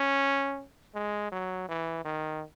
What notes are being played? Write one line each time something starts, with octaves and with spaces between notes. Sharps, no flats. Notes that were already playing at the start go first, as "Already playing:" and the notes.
Already playing: C#4
G#3
F#3
E3
D#3